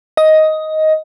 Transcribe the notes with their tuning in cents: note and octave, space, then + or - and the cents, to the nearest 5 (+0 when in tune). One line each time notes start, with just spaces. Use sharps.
D#5 +10